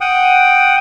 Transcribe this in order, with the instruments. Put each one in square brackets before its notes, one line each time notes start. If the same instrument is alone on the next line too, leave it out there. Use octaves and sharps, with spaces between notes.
[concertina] F#5 G5 D#6